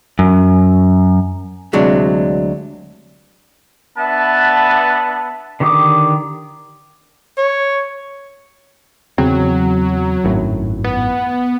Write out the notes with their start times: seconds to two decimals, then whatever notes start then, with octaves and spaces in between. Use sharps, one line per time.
0.19 F#2
1.73 D2 C3 F#3 G#3 D4
3.98 B3 D4 B4 E5 A5
5.60 D3 D#3 G4 D6 D#6
7.38 C#5
9.18 E2 C#3 F#3 C4
10.24 G#1 F#2 A2
10.84 B3